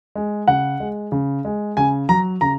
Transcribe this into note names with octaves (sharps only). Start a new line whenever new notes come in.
G#3
C#3 F#5
G#3
C#3
G#3
C#3 G#5
F#3 A#5
C#3 A#5